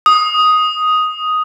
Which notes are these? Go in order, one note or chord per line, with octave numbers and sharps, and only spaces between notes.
D#6